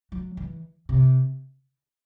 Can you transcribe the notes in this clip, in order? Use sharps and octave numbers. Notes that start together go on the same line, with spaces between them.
F#3
E3
C3